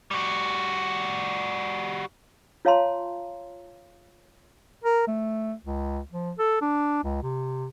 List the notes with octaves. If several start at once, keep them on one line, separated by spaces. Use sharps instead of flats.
G3 F#4
F4 C#5 F5 A5 A#5 C6
A#4
A3
C#2
F3
A4
D4
C#2
C3